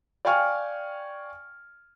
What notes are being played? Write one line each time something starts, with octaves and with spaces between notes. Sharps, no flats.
D5 F5 G5 G#5 C#6 F6